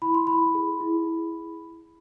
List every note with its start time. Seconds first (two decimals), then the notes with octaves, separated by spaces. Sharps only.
0.02 E4 B5
0.14 C6
0.27 E4 B5
0.55 G#4
0.81 E4
1.07 E4